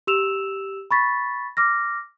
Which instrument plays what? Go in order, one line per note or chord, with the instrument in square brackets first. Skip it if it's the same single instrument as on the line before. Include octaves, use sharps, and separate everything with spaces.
[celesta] G4 E6 E7 F7
B5 C#6 A6 B6
D6 F6 A#6